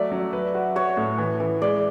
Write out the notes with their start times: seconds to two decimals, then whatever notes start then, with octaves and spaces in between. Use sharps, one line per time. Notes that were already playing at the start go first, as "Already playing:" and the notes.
Already playing: F#3 A3 D5 E5
0.12 F#3
0.33 B4
0.55 F#4
0.76 F#4 C#5
0.97 A2
1.18 E3
1.40 E3
1.62 G#3 D5